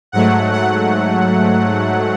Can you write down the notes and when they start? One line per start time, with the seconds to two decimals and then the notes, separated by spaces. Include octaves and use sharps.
0.12 G#2 F#3 A3 F#5
0.53 F#5